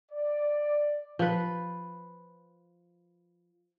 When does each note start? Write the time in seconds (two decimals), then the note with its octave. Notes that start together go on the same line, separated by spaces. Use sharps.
0.12 D5
1.19 F3 B4